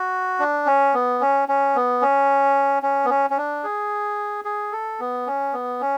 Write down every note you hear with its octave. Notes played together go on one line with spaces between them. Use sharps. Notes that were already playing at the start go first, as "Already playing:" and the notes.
Already playing: F#4
D4
C#4
B3
C#4
C#4
B3
C#4
C#4
B3
C#4
C#4
D4
G#4
G#4
A4
B3
C#4
B3
C#4